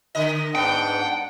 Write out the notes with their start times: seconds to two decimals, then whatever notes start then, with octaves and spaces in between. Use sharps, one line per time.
0.15 D3 D#5
0.55 G#2 B3 D4 F#5 G5